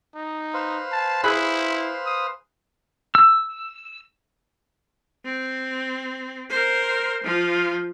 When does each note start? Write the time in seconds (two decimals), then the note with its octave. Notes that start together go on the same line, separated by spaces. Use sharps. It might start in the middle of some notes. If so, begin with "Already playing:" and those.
0.15 D#4
0.54 B4 C5 F5
0.92 A5
1.23 E4 G#4 B5 F#6
2.06 D#6
3.15 E6
5.25 C4
6.50 A#4 C5
7.24 F3 F4